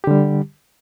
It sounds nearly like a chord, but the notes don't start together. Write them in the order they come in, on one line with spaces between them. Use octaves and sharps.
G4 D3 G3